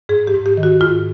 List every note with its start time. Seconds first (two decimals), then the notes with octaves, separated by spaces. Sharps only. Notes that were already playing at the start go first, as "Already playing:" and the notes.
0.09 G#2 G#4
0.27 G4
0.34 G#2
0.46 G4
0.57 D#3
0.63 F#4
0.81 G#2 F4